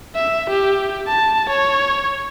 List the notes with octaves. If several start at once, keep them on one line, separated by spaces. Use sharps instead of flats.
E5
G4
A5
C#5